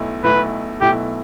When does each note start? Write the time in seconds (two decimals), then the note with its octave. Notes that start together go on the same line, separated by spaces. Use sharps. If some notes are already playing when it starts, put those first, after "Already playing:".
Already playing: B1 B2 A3 E4
0.23 B1 B2 A3 E4 B4
0.81 B1 B2 A3 E4 G4